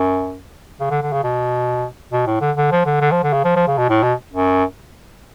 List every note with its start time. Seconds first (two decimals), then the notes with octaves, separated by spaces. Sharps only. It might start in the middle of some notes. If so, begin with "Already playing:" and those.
Already playing: F#2
0.80 C#3
0.90 D3
1.02 D3
1.12 C#3
1.24 B2
2.12 B2
2.27 A2
2.41 D3
2.57 D3
2.71 F3
2.86 D3
3.01 D3
3.11 F3
3.23 D3
3.33 C#3
3.44 F3
3.56 F3
3.67 C#3
3.78 B2
3.89 A2
4.03 B2
4.33 F#2